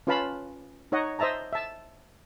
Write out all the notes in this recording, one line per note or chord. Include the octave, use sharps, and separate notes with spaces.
C#4 F4 B4 F5 A5 B5
D#4 C#5 D#5 F#5
C5 D#5 E5 A5 A#5
E5 A5